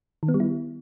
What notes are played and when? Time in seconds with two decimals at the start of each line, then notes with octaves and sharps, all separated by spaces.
0.23 D#3
0.28 B3
0.34 G3
0.40 E4